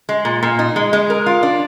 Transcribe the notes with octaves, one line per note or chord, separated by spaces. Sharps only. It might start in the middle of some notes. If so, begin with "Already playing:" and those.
G#3
A#2
A#2
D#4
G#3
G#3
A#4
F4
D4